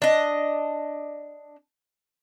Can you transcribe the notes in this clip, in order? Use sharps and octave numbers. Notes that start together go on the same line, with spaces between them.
D4 D#5